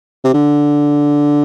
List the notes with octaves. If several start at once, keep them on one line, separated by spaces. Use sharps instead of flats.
C3
D3